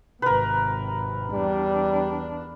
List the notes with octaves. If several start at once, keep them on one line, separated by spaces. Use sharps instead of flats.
G#1 C3 A#4 B4
E2 G3 D4